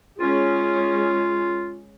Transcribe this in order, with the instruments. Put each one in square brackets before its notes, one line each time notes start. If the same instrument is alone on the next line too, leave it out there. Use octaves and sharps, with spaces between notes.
[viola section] G#3 C#4 G#4 [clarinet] F4